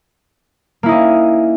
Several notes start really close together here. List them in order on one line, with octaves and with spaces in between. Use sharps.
A#3 E4 D#4 C#4